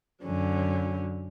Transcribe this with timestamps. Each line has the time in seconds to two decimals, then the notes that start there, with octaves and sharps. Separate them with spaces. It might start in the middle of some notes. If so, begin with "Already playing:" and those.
0.22 F#2 D3 F#3 C#4